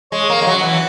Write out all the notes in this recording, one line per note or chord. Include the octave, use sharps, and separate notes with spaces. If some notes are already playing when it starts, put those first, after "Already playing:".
G#3 C#5
A#3 C#5
G#3
F#3
F#4
E3